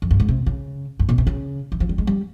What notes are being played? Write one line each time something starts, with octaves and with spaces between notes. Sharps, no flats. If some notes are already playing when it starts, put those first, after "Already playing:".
F2
G2
G#2
C3
C#3
G2
A#2
C3
C#3
E3
F3
G3
G#3
G3